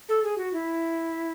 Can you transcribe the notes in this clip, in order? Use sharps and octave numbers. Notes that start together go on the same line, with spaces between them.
A4
G#4
F#4
E4